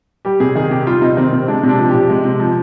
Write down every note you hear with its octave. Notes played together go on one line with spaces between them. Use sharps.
G3 G4
C3 G#4
D#3 G#4
C3 G4
G3 F4
C3 D#4
D#3 C4
C3
G#3 D4
C3
D4
F3
G4
C3
G#3
C3
F3